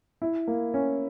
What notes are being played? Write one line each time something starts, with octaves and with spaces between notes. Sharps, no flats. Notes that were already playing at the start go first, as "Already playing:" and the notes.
E4
A#3
C#4